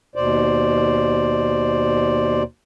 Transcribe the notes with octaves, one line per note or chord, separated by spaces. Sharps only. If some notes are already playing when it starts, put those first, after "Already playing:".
D#2 B2 C5 D5